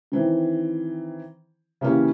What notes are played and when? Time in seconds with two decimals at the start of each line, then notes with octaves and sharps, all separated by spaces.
0.12 D#3 E3 C4
1.81 C#3 E3 A#3 C#4 G4